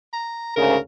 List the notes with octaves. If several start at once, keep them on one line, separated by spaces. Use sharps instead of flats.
A#5
D2 G#2 C#3 A#4